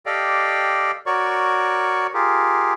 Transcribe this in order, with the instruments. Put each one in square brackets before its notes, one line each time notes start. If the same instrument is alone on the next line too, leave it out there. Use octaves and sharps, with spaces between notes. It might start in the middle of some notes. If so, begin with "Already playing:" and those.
[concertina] G4 A4 D5 D#5 F5 G5
F#4 A#4 C#5 D5 C#6
F4 G4 G#4 A#4